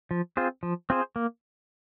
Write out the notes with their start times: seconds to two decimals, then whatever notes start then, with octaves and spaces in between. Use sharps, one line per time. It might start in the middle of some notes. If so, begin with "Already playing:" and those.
0.11 F3
0.37 C4 F4 G#4 C5
0.63 F3
0.90 C4 F4 G#4 C5
1.16 A#3